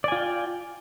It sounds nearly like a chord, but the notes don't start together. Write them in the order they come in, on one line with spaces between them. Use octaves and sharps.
D5 G#5 F4 G5